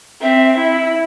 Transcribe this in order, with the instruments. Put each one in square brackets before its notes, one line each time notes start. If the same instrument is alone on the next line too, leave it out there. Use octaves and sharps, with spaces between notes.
[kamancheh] C4 [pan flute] E5
[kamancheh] E4